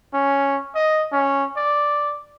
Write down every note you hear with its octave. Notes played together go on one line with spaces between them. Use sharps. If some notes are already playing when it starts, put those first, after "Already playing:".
C#4
D#5
C#4
D5